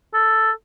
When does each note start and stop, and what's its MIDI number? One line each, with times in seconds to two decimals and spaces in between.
0.14 0.51 69